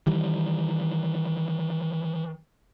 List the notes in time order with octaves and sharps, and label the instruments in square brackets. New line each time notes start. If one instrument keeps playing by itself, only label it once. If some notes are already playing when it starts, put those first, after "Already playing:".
[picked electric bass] D#3 E3 G3